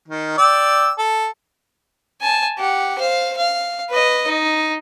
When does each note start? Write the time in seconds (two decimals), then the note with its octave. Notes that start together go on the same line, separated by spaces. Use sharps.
0.08 D#3
0.37 D5 G5 E6
0.98 A4
2.21 G#5 A5
2.58 G4 F#5
2.98 C5 F5
3.37 F5
3.90 B4 D#5
4.27 D#4